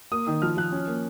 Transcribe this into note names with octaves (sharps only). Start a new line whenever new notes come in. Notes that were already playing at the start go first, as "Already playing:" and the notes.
A#3 D#6
D#3 D#6
F3 F6
F3 F#6
C#4
A#3